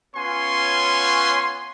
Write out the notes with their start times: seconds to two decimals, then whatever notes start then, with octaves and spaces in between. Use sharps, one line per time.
0.16 B3 C#4 F4 C#5 G#5 C6